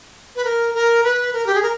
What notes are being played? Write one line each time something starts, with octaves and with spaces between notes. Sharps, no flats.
B4
A#4
A#4
B4
A#4
G4
G#4
A#4